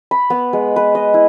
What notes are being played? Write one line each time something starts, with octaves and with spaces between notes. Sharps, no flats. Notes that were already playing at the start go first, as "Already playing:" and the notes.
B5
B3
G#3
B4
D#5
E4